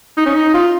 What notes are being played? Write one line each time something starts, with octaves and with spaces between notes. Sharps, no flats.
D#4
C#4
D#4
F4